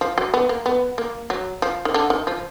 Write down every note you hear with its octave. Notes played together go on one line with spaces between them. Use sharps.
F3
F#3
B3
A#3
B3
A#3
F#3
F3
D#3
D3
D#3
F3